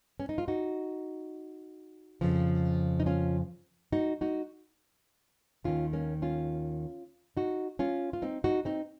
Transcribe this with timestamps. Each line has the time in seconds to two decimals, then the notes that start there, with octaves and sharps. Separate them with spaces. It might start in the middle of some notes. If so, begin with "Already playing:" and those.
0.20 C#4
0.29 D#4
0.38 F4
0.48 D#4 F#4
2.21 F2 C#3 F3
3.00 D#4
3.06 C#4 F4
3.92 D#4 F#4
4.21 D#4 F#4
5.64 D#2 D#3 C#4 F4
5.93 A#3 C#4
6.22 C#4 F4
7.37 D#4 F#4
7.79 C#4 F4
8.13 F4
8.22 C4 D#4
8.44 D#4 F#4
8.65 C4 D#4